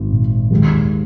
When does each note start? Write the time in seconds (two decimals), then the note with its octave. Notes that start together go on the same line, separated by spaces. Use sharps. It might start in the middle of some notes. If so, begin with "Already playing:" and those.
Already playing: G#1 G#2
0.13 A#2
0.50 D#2 D#3 G#3